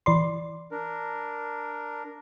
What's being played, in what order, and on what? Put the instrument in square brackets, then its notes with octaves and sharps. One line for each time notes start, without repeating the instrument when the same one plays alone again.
[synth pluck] E3 D5 C6
[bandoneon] D4 A#4